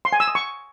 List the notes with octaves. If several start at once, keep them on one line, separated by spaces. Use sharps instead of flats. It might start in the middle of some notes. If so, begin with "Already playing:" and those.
C6
G#5
E6
D#6
C#6